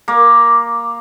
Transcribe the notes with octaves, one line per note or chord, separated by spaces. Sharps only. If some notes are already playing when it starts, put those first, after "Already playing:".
A#3